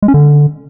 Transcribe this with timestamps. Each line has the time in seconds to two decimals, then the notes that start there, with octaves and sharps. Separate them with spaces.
0.02 G#3
0.08 C#4
0.14 D3